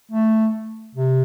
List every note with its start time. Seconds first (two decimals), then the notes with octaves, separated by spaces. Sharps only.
0.12 A3
0.95 C3